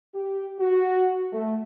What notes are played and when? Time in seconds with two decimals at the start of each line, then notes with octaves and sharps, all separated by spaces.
0.14 G4
0.60 F#4
1.32 A3